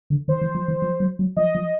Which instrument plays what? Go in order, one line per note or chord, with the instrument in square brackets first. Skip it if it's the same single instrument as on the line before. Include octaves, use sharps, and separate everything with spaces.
[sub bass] D3
[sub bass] D#3 [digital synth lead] C5
[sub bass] E3
F3
E3
F3
F#3
F#3
[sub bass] F3 [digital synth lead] D#5
[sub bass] F3